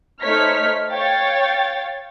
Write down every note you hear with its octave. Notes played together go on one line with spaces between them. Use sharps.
A3 D#4 C5 C#5 F6 B6
C#5 F5 G5 A6